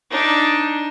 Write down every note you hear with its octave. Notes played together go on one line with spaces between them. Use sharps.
D4 D#4